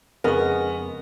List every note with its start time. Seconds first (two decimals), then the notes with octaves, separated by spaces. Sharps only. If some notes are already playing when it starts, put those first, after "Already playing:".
0.24 F2 C#3 G#3 B3 A#4 C#6